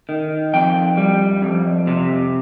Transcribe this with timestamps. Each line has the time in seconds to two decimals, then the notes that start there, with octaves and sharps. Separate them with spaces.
0.09 D#3
0.54 F2 G5
0.97 G3
1.42 F2
1.87 C3